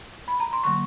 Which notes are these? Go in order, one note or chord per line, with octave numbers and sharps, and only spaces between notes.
B5
A#5
C6
D3 F#3 A#3 C#6